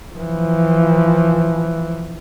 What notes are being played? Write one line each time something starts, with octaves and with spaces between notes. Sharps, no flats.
E3 F3